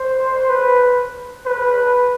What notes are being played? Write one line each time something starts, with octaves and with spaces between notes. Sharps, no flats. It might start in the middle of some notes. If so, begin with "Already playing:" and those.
Already playing: C5
B4
B4